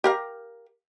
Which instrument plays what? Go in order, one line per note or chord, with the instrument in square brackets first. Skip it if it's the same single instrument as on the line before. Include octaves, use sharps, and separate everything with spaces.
[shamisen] G4 A#4 F5